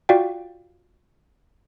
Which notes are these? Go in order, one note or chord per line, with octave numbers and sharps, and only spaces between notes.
F4 F#4 D5 F5 G5